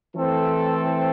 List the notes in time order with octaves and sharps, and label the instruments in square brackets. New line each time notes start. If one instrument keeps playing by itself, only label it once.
[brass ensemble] E3 A3 C4 A4